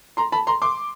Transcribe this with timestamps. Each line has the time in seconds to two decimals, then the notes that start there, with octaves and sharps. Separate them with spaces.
0.17 A#5 C6
0.32 A5 B5
0.47 A#5 C6
0.62 C6 D6